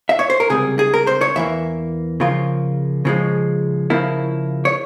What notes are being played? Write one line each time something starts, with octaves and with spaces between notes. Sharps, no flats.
E5
C#5
C5
A#4
C#2 C3 G3 G#4
G#4
A#4
C5
C#5
E2 E3 A#3 E5
C#3 F3 A#3 F4
C#3 F3 G#3
C#3 F3 A#3 E4
C#5